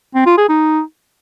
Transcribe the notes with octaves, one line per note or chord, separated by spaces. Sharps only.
C4
F4
G#4
D#4